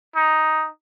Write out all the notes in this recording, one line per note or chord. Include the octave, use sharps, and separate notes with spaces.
D#4